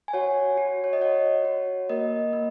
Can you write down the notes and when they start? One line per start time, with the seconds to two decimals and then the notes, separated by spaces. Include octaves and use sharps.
0.08 G#5
0.13 F#4 C#5 F#5
0.57 F#4
0.84 C#5
0.93 D#5
1.01 F#4 C#5 F#5
1.45 F#4
1.89 A#3 A#4 D#5
2.33 A#3